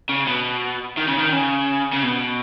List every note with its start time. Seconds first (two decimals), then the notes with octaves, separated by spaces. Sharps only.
0.09 C#3
0.27 B2
0.97 D#3
1.08 C#3
1.19 D#3
1.33 C#3
1.93 C#3
2.04 B2